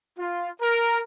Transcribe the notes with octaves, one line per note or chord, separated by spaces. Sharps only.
F4
A#4